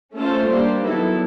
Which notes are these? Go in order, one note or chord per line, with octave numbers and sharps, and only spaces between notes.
A3 C#4 F4 A4 C5
G3 A#3 D4 G4 C5
D#3 F#3 B3 E4 A4